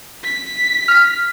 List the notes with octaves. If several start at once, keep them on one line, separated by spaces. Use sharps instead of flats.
B6
F6